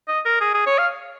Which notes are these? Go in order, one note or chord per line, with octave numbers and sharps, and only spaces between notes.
D#5
A#4
G#4
G#4
C#5
F5